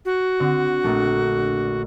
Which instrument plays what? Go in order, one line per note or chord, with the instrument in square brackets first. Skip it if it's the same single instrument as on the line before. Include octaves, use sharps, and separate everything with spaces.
[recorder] F#4
[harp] D3 C4
A#1 A3